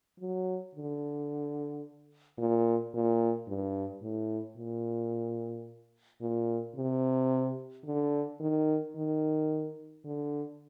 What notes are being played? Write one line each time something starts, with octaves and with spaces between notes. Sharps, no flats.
F#3
D3
A#2
A#2
G2
A2
A#2
A#2
C3
D3
D#3
D#3
D3